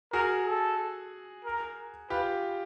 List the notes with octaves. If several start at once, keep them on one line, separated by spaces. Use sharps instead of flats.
F#4 G#4 A#4
A4
A#4
F4 G4 B4